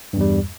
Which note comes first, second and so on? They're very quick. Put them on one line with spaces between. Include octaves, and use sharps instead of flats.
G2 E2 G3